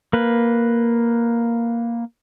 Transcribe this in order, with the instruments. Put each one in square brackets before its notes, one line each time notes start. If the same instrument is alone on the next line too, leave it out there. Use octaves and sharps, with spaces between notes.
[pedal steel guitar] A#3 B4